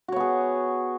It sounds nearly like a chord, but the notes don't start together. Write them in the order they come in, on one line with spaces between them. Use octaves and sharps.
F#4 C#5 B3 G#4